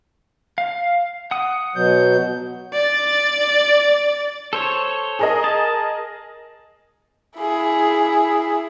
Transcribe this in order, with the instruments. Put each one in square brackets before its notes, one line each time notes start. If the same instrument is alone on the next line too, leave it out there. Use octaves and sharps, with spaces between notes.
[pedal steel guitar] F5
F#5 D#6
[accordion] B2 F#3 G6
[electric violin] D5 A6
[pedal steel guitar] A4 C5 C#5
[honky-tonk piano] G#4 A#4 D#5
[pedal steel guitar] A5
[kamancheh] E4 G#4